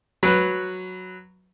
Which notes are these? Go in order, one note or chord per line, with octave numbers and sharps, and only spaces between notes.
F#3 B4